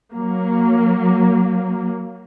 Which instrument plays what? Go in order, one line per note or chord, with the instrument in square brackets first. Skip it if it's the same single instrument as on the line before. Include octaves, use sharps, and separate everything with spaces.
[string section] F#3 A#3